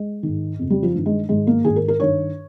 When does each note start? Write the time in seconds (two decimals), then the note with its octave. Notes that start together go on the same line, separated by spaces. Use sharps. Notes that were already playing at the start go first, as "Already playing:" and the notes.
Already playing: G#3
0.23 G#2 D#3
0.59 F2 C#3
0.70 G3
0.83 F3
0.94 G2 D#3
1.06 G#3
1.29 G#2 D#3 G#3
1.47 A#3
1.64 G#2 D#3 G#4
1.76 A#4
1.88 A#4
2.00 G2 D#3 C#5